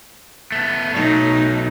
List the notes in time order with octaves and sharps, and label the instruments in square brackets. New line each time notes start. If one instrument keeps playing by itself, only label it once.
[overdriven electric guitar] A3 B3
[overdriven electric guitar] B1 F#3 [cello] A3 D#4